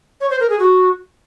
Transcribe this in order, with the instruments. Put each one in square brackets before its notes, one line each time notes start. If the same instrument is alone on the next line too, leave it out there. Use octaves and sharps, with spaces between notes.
[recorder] C#5
C5
A#4
G#4
F#4